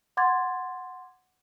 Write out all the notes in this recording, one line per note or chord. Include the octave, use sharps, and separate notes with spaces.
F#5 C6 D6 G#6 A6